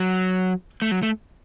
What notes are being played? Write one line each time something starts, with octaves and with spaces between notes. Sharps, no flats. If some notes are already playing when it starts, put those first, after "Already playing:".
Already playing: F#3
A3
F#3
A3